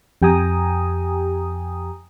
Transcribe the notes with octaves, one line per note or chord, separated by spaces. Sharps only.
F2 G4 G5 G#5 A#5 D#6